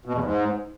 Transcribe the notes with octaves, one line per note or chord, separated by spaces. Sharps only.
B2
E2
G#2